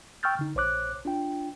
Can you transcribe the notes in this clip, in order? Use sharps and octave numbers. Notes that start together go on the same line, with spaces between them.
G5 C#6 E6 F6 G6 A6
D3 D#4
A#1 C5 C#5 D6 F#6
D4 F4 G5